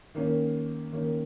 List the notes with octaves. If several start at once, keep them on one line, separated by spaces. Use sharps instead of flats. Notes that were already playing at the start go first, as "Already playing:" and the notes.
D#3 A#3 C#4
D#3 A#3 C#4